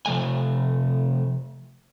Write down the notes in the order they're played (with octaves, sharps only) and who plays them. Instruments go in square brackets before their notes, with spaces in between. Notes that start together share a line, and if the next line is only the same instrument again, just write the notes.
[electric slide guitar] C3 F3 A3 G#5